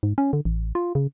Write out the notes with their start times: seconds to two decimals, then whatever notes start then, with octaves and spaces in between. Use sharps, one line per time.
0.03 G#2
0.18 C#4
0.33 D3
0.45 A1
0.75 F4
0.95 C#3